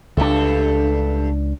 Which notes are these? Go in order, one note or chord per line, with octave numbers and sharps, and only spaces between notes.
C#2 G2 A3 D4